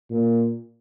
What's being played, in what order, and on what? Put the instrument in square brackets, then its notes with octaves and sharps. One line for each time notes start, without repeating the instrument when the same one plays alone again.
[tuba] A#2